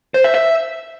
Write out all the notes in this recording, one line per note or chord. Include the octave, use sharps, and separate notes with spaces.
C5
E5
E5